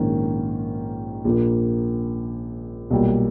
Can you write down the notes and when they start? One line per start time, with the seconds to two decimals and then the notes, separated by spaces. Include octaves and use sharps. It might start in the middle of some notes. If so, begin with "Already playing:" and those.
Already playing: A#1 G#2 D#3 A#3 C#4
1.25 A#1 A#2 A#3
2.91 B1 A#2 G3 A#3